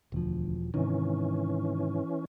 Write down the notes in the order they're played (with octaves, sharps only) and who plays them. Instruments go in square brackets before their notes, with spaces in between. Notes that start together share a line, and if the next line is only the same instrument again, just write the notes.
[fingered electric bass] E1 F3 [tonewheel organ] D2
[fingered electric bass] G#2 C3 D#3 [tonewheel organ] E3 C#4